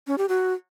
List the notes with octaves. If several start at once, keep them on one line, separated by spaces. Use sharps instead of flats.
C#4
G4
F#4